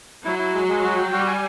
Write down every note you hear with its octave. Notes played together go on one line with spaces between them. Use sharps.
F#3 E4
E4
G#3
G#3
F#4
G5
G3 F#4
G#5